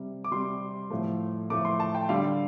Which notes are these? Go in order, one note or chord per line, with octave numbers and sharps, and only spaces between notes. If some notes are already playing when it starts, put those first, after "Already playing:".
Already playing: C3 G3
D6
C3 G3 C6
A2 F3 A3
A2 F3 A3 D6
C6
A5
G5
D3 G3 F5